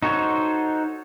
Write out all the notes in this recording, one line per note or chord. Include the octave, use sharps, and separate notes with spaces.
D#4 F#4 A4 C5 C#5